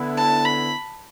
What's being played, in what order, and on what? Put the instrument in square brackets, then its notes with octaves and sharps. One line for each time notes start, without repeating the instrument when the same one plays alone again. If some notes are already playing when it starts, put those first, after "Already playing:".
Already playing: [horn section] D3 B3 E4
[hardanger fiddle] A5
B5